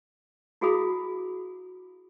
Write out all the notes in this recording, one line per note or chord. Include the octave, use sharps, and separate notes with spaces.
E4 F#4 G#4 F5 B5 D#6